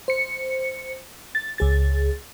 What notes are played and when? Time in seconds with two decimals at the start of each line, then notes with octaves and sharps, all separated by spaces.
0.08 C5 C#7
1.35 A6
1.58 C#2 G#4 A6